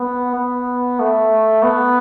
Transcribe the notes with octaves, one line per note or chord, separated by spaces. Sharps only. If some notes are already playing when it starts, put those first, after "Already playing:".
Already playing: B3
B3
A3
B3